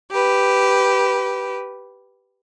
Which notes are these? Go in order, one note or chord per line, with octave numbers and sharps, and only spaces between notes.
G4 B4